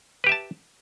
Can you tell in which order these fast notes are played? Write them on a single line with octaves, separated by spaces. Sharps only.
B4 G4 E5 A5